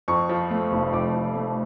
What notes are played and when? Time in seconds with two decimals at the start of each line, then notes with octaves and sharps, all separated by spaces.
0.08 F2 C#6
0.29 F3
0.51 A3
0.72 F1
0.93 F2 D6
1.14 F3
1.36 A3